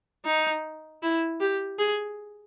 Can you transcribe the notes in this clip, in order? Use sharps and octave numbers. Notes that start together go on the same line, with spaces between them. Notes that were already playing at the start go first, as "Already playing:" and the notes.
D#4
E4
G4
G#4